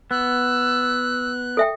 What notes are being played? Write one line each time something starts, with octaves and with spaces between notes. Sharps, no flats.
B3 E6 F#6
A4 E5 G5